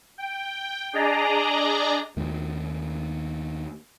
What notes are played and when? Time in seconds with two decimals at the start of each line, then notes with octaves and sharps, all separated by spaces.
0.18 G5
0.93 D4 G#4 D5 D#5 A#5
2.17 D#2 D#3 A3